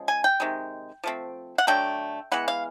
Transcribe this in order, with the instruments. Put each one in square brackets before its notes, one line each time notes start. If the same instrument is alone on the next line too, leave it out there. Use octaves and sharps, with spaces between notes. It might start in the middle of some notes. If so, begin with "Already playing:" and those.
Already playing: [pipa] C#3 F3 G#3
G#5
G5
C3 D#3 G#3
F3 A3 C4
F#5
D3 F#3 A3 G5
E3 G#3 B3 F#5
F5